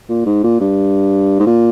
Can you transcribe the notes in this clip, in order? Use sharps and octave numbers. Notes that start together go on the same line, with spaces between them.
A#2
G#2
A#2
G2
G#2
A#2